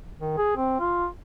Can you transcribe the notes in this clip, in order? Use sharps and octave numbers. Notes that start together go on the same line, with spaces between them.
D#3
G#4
C4
F4